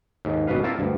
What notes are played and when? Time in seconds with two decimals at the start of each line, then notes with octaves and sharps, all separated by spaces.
0.25 D#2 G#2
0.47 G#1 B2 A#3 B4 F5
0.64 A#3 C4 E4 F4 A5
0.79 D2 G2